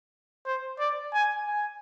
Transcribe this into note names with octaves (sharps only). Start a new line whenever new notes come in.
C5
D5
G#5
G#5